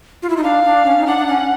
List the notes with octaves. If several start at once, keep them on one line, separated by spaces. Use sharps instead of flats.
F4
E4
D#4
D4 F5
D4
C#4
D#4
D4 F#5
D4
C#4